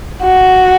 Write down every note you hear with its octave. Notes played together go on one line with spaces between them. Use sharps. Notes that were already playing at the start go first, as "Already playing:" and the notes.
F#4